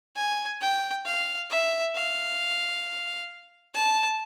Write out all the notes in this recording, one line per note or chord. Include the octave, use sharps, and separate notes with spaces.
G#5
G5
F5
E5
F5
A5